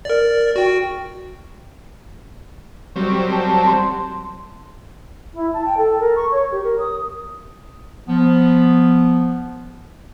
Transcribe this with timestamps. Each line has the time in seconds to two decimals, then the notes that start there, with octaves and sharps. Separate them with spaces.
0.05 A#4 D5
0.56 F#4 G5
2.96 F#3 G3 C4 C#6
3.31 A5
3.66 C6
5.34 E4
5.54 A5
5.66 G5
5.77 A4
6.00 A#4
6.16 C#6
6.32 C#5
6.52 G4
6.64 A#4
6.79 D#6
8.07 F3 B3